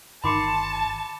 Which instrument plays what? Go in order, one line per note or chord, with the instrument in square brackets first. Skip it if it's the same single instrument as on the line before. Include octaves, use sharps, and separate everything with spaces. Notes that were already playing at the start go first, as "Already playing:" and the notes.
[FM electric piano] G1 D#3 C6 [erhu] A5 [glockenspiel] B5 D6 C#7